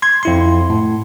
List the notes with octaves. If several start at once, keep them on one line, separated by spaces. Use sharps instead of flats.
C6 G#6
F2 E4 C6
A2